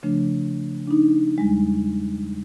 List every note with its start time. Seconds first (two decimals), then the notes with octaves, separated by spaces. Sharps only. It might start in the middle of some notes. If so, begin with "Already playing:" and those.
0.03 C#3 F3 A3 D4
0.87 D4 D#4
1.38 E2 G3 G#3